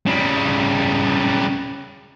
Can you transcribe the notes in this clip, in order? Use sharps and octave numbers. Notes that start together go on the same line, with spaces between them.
C#3 G3